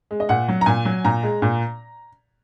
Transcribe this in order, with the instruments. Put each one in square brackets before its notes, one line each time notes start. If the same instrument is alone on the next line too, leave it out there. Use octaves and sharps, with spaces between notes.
[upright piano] G#3
D#5
A#2 F#5
F#3
A#5
A#2 G#5
F#3
A#2 A#5
G#3
A#2